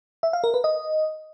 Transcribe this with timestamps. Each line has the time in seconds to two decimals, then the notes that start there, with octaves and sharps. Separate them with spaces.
0.23 E5
0.33 F5
0.44 A#4
0.54 B4
0.64 D#5